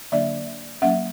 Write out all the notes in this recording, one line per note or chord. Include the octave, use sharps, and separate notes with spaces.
D3 F#3 A#3 D4 D5 E5
F#3 A#3 C#4 E5 F#5